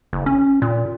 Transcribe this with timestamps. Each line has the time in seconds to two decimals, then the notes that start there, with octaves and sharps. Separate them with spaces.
0.13 F#1
0.26 C#4
0.62 A#2